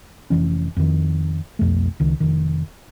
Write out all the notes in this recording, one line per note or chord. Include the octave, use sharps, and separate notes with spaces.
F1 E2 E3 C#4
F2 D#3
B1 F2 A3
C#2 D#3
F1 D#3